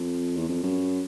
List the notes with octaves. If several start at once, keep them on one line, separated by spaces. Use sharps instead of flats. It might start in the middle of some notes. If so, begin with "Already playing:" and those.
Already playing: F2
E2
F2
F#2